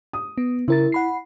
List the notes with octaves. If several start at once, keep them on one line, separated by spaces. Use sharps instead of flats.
D#6
B3
C#3 E4 A#4 A6
F#5 B5 C7